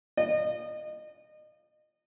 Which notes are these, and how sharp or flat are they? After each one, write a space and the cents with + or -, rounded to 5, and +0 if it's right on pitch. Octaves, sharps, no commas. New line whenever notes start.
D#5 -30